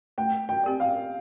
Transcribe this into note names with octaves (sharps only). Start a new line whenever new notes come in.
A3 G5
G5
C4 G4 D5
F5